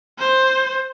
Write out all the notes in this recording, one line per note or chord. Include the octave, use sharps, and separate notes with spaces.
C5